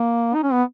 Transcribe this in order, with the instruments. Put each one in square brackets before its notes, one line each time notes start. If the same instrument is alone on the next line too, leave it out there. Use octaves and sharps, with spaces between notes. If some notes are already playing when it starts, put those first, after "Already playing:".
Already playing: [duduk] A#3
D#4
C#4
B3